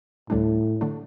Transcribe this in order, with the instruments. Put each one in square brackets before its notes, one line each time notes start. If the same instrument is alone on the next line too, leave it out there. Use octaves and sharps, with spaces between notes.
[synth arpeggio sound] D2 D3 G3 D4 [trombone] A2
[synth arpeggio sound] D3 A3 D4